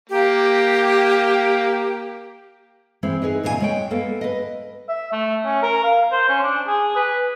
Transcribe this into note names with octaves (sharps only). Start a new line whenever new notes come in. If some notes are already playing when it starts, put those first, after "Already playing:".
A#3 G4
E3 G#3 C4
D#4 G#4 B4 D#5
E2 A#2 C#3 F#4 G#5
G#3 C#5 G5
A#3 B3 A4
B4 D#5
E5
A3
C#4
A#4
F5
C5
C#4
D4
G#4
B4